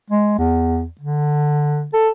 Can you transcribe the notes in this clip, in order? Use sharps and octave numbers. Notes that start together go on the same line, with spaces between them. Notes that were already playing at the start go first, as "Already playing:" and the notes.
G#3
E2
D3
A4